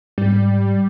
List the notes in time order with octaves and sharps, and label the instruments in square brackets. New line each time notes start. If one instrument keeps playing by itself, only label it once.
[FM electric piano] G#2 [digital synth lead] G3